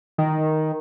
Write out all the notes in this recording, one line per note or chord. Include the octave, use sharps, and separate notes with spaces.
D#3